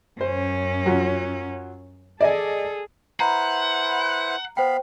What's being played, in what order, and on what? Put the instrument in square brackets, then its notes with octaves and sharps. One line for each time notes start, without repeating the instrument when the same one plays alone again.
[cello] F#2 C#4 [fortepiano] C5
[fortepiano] F#3 F4
[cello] G#4 A4 [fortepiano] D5 D#5 G#5
[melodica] E4 B4 C5 [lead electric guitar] F#5 [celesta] A#5
[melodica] B3 F5 B5 [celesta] C5 G5